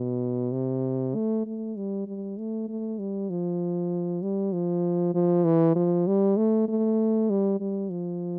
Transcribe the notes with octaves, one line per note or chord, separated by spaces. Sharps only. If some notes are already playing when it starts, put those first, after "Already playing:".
Already playing: B2
C3
A3
A3
G3
G3
A3
A3
G3
F3
G3
F3
F3
E3
F3
G3
A3
A3
G3
G3
F3